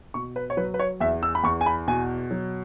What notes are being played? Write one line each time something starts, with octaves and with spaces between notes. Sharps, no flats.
B2 C#6
B4
C#5
F#3 B4
B4
C#5
E2 E5
E6
B5
E2 C#6
G#5
B5
B2 G#5
F#3